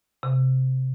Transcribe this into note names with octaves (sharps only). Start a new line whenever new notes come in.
C3